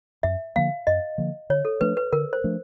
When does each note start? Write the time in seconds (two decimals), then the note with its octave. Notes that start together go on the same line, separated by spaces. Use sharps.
0.23 F#2 E5
0.56 D3 F3 A#3 F5
0.87 F#2 D#5
1.18 D3 F3 A#3
1.50 D3 C#5
1.65 A4
1.81 F3 A3 D4 B4
1.97 B4
2.12 D3 A#4
2.33 C5
2.44 F3 A3 D4